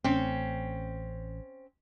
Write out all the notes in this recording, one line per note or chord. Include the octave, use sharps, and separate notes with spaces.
A1 A3 C4 C#4